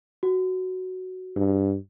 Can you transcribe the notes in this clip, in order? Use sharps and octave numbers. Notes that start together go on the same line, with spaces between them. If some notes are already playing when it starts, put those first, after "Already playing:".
F#4
G2